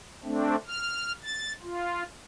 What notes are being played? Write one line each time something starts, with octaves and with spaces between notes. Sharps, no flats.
A3 C4 D4
F6
A6
F4